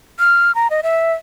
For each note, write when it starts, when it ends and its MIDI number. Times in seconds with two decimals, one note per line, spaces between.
0.19 0.52 89
0.55 0.68 82
0.71 0.81 75
0.83 1.13 76